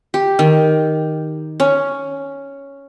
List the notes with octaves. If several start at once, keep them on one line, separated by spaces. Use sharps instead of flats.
G4
D#3
C#4